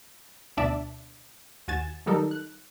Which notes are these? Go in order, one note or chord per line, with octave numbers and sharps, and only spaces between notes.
D2 B2 D4 D5 E5 A5
D#2 F#4 G#5 G#6 A6 E7
D#3 F#3 G3 D#4 A4 A#4
F#6